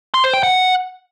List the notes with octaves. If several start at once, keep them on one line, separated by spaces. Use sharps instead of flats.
C6
C5
G5
F#5